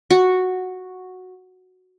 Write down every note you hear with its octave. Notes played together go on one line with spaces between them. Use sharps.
F#4